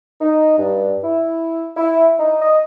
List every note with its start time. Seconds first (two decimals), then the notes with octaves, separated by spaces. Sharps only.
0.21 D#4
0.58 G2
1.03 E4
1.76 E4
2.19 D#4
2.41 D#5